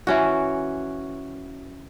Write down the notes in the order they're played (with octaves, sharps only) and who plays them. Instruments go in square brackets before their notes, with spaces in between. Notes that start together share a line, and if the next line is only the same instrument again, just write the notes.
[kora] E3 C#4 F#4